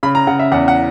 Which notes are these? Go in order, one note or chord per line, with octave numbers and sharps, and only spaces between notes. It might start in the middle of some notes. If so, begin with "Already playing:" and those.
C#3 B5
A#5
C#3 F#5
E5
E2 F#5
F#5